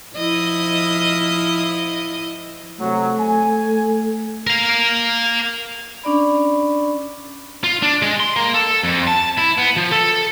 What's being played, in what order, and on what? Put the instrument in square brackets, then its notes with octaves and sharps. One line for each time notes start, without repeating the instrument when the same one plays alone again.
[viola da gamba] F3 E4 D#5
[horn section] C3 F#3 [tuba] A3
[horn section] G#5
[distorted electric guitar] A#4 F5
[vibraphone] C#4 D4 D5 B5
[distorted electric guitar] F4
D4
G#3
C6
A#3
A4
F2
A5
E4
B3
F3
A4